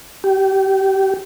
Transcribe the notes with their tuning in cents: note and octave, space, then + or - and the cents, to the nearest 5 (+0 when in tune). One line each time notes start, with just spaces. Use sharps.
G4 -25